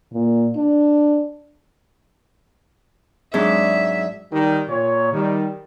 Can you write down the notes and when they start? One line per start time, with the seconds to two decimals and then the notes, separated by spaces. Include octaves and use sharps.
0.13 A#2
0.56 D4
3.34 G#2 F#3 D4 E5
4.31 D#3 G3
4.68 A#2 C#5
5.12 D#3 G3